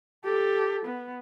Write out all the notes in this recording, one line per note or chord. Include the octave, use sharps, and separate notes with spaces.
G4 A4
B3